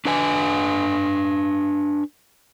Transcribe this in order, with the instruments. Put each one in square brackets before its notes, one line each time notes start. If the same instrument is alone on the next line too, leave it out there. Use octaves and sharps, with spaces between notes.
[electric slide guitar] D4 B4 G#5